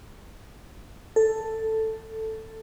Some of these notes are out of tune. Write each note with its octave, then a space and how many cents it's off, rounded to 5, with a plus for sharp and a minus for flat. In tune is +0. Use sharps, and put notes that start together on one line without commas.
A4 +5